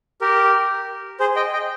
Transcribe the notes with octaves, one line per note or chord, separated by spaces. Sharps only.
G4 A#4
G#4 C5
D#5 G5
D#5 G5